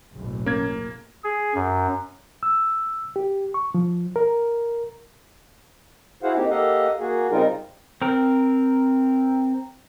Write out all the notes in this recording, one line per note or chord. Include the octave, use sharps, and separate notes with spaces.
F#1 B1 A2
A#3 C#4 G#6
G#4
F#2
E6
G4
C#6
F3
A#4
E4 F#4 G#4 C5 F5 F#5
A#3 C4 D#4 G4
A#3 G4 A4 D#5 F5 F#5
A#3 F#4 G#4
C#3 G3 C4 D#4 F4 A#4
C4 A#4